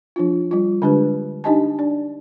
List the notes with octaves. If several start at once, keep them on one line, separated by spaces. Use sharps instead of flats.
F3 D4 F4
G3 F4
D3 G#3 D4 G4 B4
D4 D#4 G4 D#5 G#5 A5
D4 D5